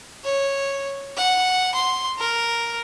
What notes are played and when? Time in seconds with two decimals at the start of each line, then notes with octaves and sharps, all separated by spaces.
0.24 C#5
1.17 F#5
1.75 C6
2.19 A#4